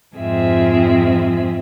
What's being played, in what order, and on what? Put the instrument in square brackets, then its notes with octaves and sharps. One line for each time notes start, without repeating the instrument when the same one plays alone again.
[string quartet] F2 G#2 C4 F4 G#4 E5